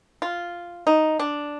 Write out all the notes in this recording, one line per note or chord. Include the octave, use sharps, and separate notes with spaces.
F4
D#4
D4